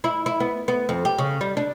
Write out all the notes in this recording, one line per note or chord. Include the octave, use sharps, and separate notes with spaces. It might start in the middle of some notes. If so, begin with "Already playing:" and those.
E4
E4
B3
B3
F2
G4
C#3
G3
D4